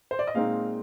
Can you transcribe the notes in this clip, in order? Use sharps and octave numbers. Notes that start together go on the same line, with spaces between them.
C5
D5
D#5
A#2 G#3 C4 D#4 F5